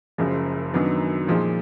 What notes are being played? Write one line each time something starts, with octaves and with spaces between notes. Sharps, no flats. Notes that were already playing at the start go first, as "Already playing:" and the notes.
F#1 F#2 F3 G#3
F#2 D#3 F#3 B3 D4
A#2 F3 G#3 D#4